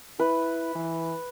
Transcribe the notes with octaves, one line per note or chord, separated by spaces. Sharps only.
E4 B4
E3